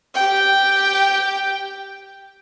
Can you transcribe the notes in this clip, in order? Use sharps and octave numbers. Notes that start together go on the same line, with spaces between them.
G4 G5